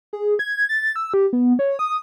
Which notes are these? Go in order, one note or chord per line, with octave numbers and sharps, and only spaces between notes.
G#4
G#6
A6
E6
G4
B3
C#5
D#6